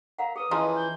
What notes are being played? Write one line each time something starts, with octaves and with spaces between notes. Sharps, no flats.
A#4 F5 F#5 A#5
G#4 B4 D#6
C#3 E3 F3 A#4 D#5 A#5 C6
G6